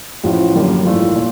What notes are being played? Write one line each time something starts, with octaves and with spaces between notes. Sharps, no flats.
A1 A2 F3
F#2 D3 G3 A#3
G#2 E3 A3 D4 F4
A#2